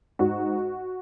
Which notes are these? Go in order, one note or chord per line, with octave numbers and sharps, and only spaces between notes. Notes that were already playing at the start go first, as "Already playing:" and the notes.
G#2 F#4